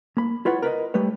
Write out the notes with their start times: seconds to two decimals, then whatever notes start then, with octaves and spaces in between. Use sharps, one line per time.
0.17 A#3 B5
0.45 E4 F4 B4 C#5 F#5
0.62 A#4 B4 C#5 D#5
0.94 G3 A3 B4 C#5